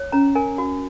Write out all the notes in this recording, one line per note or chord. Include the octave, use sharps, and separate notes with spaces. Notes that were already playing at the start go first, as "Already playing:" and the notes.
Already playing: C#5
C#4 A#5
A#4 G#5
F#4